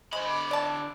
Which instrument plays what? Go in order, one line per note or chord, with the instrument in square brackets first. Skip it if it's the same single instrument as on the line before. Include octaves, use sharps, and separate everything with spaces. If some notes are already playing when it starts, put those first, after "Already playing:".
[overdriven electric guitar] D3 B5 [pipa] G#3 C5
[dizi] D6
[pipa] D5 A5